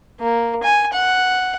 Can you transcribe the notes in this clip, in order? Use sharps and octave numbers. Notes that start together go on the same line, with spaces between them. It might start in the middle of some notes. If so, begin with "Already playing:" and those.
A#3
G#5
F#5